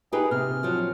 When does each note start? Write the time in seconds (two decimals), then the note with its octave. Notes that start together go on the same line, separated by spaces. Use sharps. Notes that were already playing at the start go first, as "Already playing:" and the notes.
0.12 D#4 G4 G#4 B4
0.31 C3 F6
0.63 F3 F#3